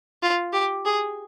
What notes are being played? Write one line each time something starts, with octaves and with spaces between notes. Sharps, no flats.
F4
G4
G#4